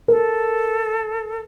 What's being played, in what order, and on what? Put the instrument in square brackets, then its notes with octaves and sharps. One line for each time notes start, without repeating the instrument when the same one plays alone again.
[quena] A4 [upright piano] A#4